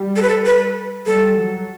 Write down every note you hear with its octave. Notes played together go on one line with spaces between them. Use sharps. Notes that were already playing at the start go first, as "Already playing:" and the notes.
Already playing: G3
A4
B4
A4
B4
G3 A4
F#3